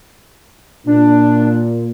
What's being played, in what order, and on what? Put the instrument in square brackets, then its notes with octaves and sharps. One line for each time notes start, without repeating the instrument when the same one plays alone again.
[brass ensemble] A#2 [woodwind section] D4